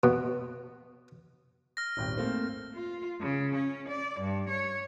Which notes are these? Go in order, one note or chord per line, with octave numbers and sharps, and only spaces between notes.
B2
F6 A#6
D#1 G#1 G5
A3 A#3 C4
F4
C#3
C#4
D5
G2
C#5